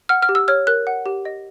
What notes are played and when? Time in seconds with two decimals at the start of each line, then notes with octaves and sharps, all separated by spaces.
0.09 F#5 F6
0.22 F6
0.29 G4
0.35 E6
0.48 C#5 F6
0.67 A#4 F#6
0.87 F#5
1.06 G4
1.25 D#5